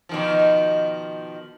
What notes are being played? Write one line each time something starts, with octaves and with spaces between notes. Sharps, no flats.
B2 D#3 F3